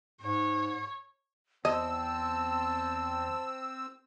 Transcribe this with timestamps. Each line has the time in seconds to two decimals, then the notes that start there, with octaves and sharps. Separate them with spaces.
0.21 G#2 C#5
1.65 E2 C4 D#5 A5 E6